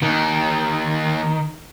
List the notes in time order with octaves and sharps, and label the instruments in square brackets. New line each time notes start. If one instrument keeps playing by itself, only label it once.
[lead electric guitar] D#2 [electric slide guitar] D#3